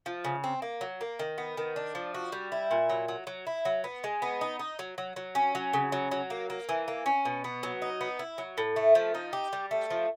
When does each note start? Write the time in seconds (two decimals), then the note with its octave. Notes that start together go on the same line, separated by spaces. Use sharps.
0.06 F3
0.24 C#3
0.44 C4
0.62 A#3
0.81 F#3
1.01 A#3
1.19 D#3
1.38 B3
1.57 D#3
1.76 D4
1.95 F3
2.14 F#4
2.32 G3
2.52 E4
2.71 A#2
2.90 F#3
3.08 F#3
3.27 F#3
3.47 E4
3.65 F#3
3.84 B3
4.04 G#3
4.22 B3
4.41 D#4
4.59 D#4
4.79 F#3
4.98 F#3
5.16 F#3
5.35 C#4
5.55 F#3
5.73 C#3
5.92 F#3
6.11 F#3
6.30 A#3
6.50 A#3
6.69 E3
6.88 A#3
7.06 C#4
7.25 B2
7.44 B3
7.63 F#3
7.82 D#4
8.01 B3
8.19 E4
8.38 F#3
8.58 A2
8.76 A3
8.95 F3
9.15 D#4
9.33 G4
9.53 G3
9.71 A3
9.90 F3